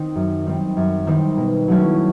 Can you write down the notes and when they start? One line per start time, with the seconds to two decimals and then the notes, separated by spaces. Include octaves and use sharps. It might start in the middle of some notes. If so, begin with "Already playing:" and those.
Already playing: D#3 C4 D#4
0.15 F#2
0.46 D#3 G3 C4 D#4
0.77 F#2
1.07 D#3 G3 C4 D#4
1.37 B2
1.68 F#3 A3 C#4 E4